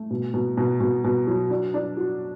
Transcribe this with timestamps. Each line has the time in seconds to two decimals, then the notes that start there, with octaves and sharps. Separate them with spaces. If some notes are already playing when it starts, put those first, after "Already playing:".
Already playing: A3
0.11 B2
0.34 B2
0.57 B2
0.80 B2
1.04 B2
1.27 F#3
1.50 D4
1.74 D4
1.97 F#4